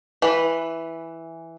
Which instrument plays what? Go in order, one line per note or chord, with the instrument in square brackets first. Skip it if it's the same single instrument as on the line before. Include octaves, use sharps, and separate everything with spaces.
[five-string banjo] E3 B4